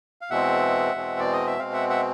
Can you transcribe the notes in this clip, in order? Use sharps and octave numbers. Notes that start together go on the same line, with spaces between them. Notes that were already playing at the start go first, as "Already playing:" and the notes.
F5
E2 B2 G#3 C4 E5 F#5
E2 B2 G#3 C4
D5
D#5
E5
B2 G#3 C4 F5
E5 F#5
E5 F#5